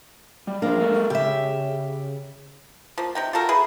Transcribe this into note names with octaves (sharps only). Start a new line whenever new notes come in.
G3
F3 A#3 D4
G#3 A4 A#4
C#3 G4 E5
F3 A#3
C3 D#4 G5
F4 F#4 A4 A#4
E4 G#4 B4